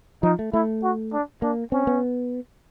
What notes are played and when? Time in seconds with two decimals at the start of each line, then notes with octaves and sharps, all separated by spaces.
0.23 F3 D#4
0.39 A3
0.53 A3 E4
0.83 F#4
1.13 D4
1.42 A#3 D4
1.72 C4 C#4
1.87 B3